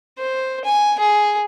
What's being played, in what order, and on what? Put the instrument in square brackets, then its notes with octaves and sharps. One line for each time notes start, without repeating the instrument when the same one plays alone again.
[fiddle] C5
G#5
G#4